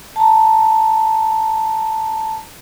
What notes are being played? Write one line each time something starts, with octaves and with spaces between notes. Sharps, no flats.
A5 A#5